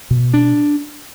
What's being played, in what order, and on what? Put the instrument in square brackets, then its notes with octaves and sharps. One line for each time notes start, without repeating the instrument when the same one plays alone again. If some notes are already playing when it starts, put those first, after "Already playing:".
[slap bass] B2
D4